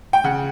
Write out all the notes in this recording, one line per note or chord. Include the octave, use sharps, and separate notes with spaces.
G5
C#3 F#5